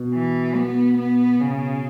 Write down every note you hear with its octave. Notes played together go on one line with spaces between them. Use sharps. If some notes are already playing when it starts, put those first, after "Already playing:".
Already playing: B2
E3
B3
B3
C#3